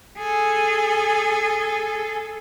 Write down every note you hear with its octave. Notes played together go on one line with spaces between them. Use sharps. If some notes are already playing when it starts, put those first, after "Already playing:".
G#4 A4